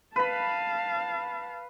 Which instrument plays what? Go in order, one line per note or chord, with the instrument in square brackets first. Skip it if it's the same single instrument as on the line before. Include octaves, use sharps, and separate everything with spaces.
[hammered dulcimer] B4 B5 [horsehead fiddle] F5 A5